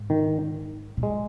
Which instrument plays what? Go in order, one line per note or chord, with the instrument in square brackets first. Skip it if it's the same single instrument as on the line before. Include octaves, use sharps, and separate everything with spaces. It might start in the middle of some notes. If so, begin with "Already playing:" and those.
Already playing: [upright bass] G#2
[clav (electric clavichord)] D#3
[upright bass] A#2
[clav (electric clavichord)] G#3